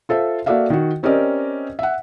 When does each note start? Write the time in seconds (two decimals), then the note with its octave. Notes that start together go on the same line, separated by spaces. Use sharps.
0.09 F4 A4 C5 E5
0.46 A#3 F#4 A4 D5 E5 F5
0.70 D#3 F#4
1.03 C4 C#4 G4 A#4 D5 D#5
1.79 E5 F#5